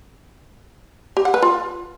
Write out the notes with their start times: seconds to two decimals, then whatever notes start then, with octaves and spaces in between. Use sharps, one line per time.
1.17 G4
1.25 F#5
1.34 B4
1.42 F4